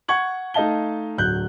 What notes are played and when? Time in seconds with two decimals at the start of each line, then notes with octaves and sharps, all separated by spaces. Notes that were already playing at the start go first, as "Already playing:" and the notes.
0.08 F#5 C#6 G#6 F#7
0.54 A3 D#4 D#5 F5 A5 G7
1.18 D1 F#3 F#6 G6